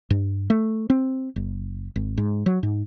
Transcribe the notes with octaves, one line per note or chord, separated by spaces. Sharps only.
G2
A3
C4
F#1
G#1
G#2
F#3
G#2